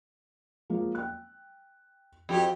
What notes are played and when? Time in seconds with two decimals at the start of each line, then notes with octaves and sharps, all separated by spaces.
0.70 F3 G#3 A#3
0.95 G5 F#6
2.29 F2 F#4 G4